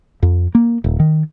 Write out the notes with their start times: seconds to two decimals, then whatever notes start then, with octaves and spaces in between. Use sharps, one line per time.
0.23 F2
0.55 A#3
0.84 D#1
1.00 D#3